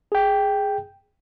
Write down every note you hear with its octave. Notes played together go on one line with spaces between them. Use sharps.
G#4 G5